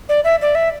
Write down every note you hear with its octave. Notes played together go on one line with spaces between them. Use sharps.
D5
E5
D5
E5